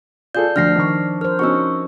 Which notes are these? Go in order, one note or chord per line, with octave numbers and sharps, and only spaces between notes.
F4 G#4 A4 D5 G6
D2 F3 D4 F6 A#6 C7
D#3 C#6
A#4 C5 F6
C#4 D#4 F#4 C#6 E6